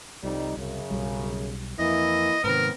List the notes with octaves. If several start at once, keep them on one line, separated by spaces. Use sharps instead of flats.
C2 F2 G3 D#4
C2 F#2 C#3
B1 G3
F2 E3 A#3 E4 D#5
G#2 C3 D#3 B3 C4 A#4